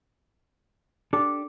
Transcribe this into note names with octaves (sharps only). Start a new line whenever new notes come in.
D4 G4 A4 D6